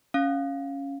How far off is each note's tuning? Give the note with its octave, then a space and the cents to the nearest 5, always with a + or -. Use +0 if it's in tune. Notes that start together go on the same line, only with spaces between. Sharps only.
C#4 +0 F5 +0